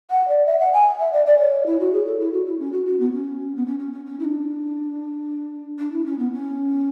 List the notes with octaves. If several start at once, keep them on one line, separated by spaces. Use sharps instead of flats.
F#5
D5
E5
F#5
G#5
E5
D5
D5
C#5
E4
F#4
G#4
A4
E4
F#4
E4
C#4
F#4
F#4
B3
C#4
B3
C#4
C#4
C#4
C#4
E4
D4
D4
E4
C#4
B3
C#4